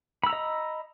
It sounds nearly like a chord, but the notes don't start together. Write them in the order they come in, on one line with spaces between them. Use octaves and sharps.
B5 E6 A#5 D#5